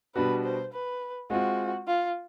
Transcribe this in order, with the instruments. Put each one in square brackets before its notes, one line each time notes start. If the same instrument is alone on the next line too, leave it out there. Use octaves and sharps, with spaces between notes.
[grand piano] B2 G3 B3 D4 F#4 [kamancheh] B4
[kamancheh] C5
B4
[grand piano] G#3 C4 F4 [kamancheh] F#4
[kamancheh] F4